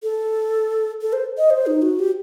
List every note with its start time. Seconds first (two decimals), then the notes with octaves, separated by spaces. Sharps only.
0.03 A4
1.01 A4
1.13 C5
1.38 D#5
1.50 C5
1.67 D#4
1.82 F#4
1.99 G4